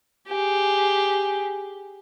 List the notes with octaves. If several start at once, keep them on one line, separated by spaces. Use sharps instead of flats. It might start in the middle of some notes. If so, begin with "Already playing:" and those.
G4 G#4